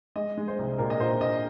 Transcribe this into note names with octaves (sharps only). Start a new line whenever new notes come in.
G#3 D#5
G#3
C5
C2
A#2 A#4
D#5
A#2 C5
A#2 D#5